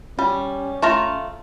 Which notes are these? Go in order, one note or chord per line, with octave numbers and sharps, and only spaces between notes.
G3 C#4
A3 F4 A#5